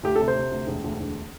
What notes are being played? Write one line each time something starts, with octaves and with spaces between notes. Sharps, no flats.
D2 G4
C3 A4
C5
C3
D2
E1
D2
E1